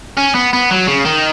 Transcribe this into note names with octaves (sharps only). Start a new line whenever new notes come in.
C#4
B3
B3
F#3
C#3
D#3